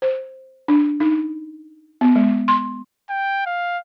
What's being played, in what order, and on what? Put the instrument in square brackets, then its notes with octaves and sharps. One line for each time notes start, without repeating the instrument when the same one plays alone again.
[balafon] C5
D4
D#4
B3
G#3
C6
[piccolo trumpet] G5
F5